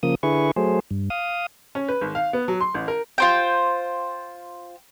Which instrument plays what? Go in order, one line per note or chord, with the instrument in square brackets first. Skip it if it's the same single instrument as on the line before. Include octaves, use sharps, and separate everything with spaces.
[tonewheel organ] C#3 F3 A#3 D#6
D3 E4 G#4 B4 C#6
F#3 A3 G#4 C5
G2
F5 D#6
[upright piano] C#4
B4
G#1
F5
B3
F#3
C6
A1
A#4
[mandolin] F4 C5 G5